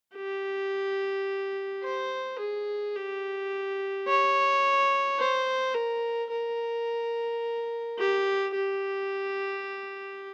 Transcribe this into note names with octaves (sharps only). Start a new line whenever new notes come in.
G4
C5
G#4
G4
C#5
C5
A#4
A#4
G4
G4